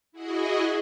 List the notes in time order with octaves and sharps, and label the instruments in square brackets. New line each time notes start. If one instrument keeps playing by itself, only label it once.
[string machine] E4 F#4 G#4 D#5